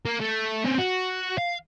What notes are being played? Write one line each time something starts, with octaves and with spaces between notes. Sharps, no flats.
A#3
A3
C4 C#4
F#4
F5